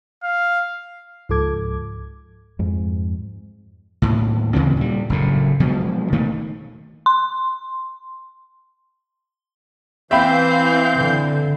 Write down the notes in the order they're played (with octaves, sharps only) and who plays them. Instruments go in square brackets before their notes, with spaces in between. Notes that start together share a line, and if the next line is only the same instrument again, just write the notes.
[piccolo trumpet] F5
[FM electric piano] C#2 G#2 F3 A4 D6 G#6
[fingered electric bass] F2 G#2
[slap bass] D#2 A2
D#2 C#3 E3 C4
A#2 G3
F#1 F#2 A2
B2 F3 F#3 G#3
D#3 A3 A#3
[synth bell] C6
[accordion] E3 F5 G6 [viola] C4 [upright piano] E5 G5 B5
[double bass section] D3